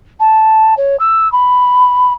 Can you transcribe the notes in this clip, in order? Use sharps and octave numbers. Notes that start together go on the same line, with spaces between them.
A5
C#5
E6
B5